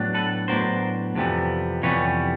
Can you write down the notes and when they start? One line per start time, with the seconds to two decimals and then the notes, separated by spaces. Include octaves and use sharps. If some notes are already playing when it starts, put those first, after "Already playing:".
Already playing: A2 F#3 B3 D4
0.14 A4 B4
0.48 A2 F#3 B3 D4 A#4 C5
1.15 F2 C3 E3 G3 B3
1.82 F2 C3 E3 G3 B3 B4 C#5